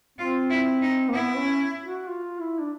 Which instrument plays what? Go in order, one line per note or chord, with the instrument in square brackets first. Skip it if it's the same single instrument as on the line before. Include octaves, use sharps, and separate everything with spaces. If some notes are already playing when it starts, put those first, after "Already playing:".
[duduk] C4 [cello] F4
[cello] E4
D#4
[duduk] A#3
[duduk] B3 [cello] E4
[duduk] C#4
F#4
F4
E4
D4